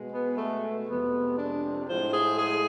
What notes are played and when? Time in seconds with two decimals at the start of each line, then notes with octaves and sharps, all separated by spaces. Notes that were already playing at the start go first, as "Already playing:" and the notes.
Already playing: B2 G#3
0.12 B3
0.37 A3
0.87 F2 C3 G#3 B3
1.37 D4
1.87 A2 F3 G#3 C5
2.13 G#4
2.37 G#4